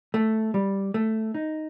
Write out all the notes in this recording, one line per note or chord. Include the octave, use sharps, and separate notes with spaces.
A3
G3
A3
D#4